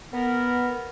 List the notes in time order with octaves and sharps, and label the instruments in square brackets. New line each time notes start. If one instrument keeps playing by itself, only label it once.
[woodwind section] B3 A#4